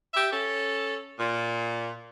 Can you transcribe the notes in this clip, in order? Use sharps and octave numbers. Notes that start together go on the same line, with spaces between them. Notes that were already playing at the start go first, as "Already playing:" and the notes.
G4 E5
C#4 A4
A#2